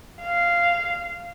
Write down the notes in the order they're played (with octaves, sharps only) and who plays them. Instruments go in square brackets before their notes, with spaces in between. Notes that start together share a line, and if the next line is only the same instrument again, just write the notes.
[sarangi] F5